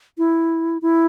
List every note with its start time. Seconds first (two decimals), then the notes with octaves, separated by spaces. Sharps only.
0.18 E4
0.82 E4